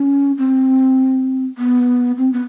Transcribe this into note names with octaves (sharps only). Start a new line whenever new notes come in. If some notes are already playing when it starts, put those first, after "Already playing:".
Already playing: C#4
C4
B3
C4
B3